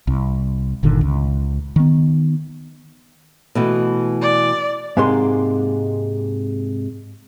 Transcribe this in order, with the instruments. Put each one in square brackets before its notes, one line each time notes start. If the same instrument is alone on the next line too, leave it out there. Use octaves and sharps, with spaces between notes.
[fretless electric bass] C2
G1 A#2 D3 D#3
C#2
D#3 B3
[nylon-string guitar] B2 E3 A3
[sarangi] D5
[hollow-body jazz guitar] G#2 C3 G#3 A#3 C6